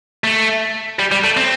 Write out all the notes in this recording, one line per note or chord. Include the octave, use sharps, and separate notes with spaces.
A3
G3
G3
A3
C4